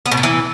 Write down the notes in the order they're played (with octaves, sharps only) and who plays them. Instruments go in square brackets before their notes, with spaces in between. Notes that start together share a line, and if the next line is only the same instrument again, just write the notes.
[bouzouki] B3
B2
A#2
E3